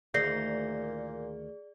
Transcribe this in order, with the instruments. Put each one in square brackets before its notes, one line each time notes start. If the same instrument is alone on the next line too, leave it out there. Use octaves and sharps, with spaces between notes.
[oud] D2 D#3 [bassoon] A#2 [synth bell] G#4 D5 [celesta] G6 A#6 C7